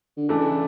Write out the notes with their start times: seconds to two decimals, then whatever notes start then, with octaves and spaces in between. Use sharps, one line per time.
0.17 D3
0.29 C#3 E3 A3 D4
0.49 C#3